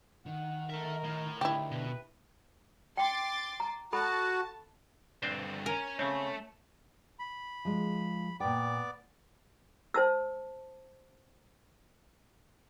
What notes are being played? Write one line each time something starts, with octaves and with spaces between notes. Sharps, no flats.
D#3 F#5
A4 A#4 E5
A2
D2 D#3 E4 G4
B2 B4
G5 C6 D6 A6
A#5
F#4 A4 A5 B5
D2 G2 C4 D4 C5
A#4 C#5 G#5
C#3 A3 C4 C#4
B5
F3 G#3
A#2 B3 D5 G5 D6
C5 A5 E6